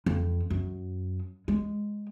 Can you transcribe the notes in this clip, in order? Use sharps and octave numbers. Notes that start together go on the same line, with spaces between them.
F2
F#2
G#3